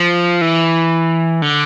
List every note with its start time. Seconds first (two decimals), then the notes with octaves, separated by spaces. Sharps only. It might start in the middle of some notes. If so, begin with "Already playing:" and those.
Already playing: F3
0.41 E3
1.42 D3